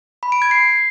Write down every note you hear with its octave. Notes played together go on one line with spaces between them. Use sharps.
B5
D7
G#6
C7